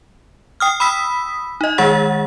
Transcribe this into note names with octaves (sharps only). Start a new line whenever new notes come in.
G5 D#6 F6
B5 D#6 E6 B6
D#4 D#5
D#3 G#3 G#4 F#5 A6